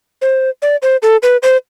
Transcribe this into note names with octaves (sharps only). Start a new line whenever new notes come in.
C5
D5
C5
A4
B4
C5